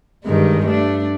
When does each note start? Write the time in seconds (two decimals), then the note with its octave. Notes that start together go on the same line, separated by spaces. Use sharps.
0.24 G2 D#3 G#3
0.66 A3 D4